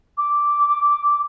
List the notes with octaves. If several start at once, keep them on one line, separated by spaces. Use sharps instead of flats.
D6